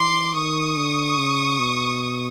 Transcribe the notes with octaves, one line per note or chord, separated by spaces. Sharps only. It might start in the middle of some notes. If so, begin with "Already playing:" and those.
Already playing: E3 C6 D6
D#3 C#6 D#6
D3
C#3
B2